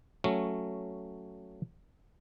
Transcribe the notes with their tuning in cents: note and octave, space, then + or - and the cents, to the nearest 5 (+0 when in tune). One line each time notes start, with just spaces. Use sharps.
F#3 +0 A3 +0 C#4 +0